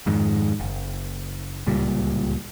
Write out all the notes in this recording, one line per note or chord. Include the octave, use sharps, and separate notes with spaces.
F2 G#2 D#3
F#1
D1 C#2 A#2 G3